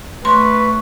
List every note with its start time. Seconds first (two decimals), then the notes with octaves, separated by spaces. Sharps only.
0.25 A3 B4 C#5 C6